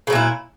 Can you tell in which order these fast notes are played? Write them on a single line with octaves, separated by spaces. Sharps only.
C#3 F#3 A#2 E4